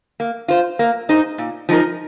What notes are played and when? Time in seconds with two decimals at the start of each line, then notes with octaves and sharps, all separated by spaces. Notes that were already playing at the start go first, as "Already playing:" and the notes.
0.20 A#3
0.48 F4 C5
0.79 A#3
1.09 D#4 G#4 C5
1.38 A#2
1.69 F3 G#3 D#4 A#4